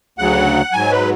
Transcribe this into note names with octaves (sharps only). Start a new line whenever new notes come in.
D2 C#3 F#3 F#5
G#2 F#3 G#5
B4